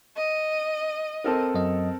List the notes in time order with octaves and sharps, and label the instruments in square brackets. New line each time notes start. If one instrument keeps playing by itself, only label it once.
[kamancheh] D#5
[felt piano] C4 A4 A#4
[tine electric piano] F#2 F#3 D#5